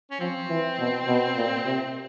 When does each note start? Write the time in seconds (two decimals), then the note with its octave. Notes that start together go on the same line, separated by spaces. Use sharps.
0.11 C#4
0.19 F3 C4
0.49 E3
0.78 B2
1.08 B2
1.36 A#2
1.65 C3